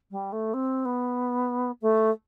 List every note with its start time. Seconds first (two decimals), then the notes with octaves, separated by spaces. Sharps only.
0.11 G3
0.32 A3
0.54 C4
0.85 B3
1.82 A3